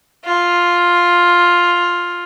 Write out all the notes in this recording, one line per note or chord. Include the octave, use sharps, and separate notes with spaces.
F4